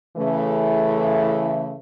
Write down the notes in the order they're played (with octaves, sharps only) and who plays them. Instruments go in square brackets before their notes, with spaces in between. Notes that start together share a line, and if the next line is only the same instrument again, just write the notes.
[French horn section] C#3 E3 A3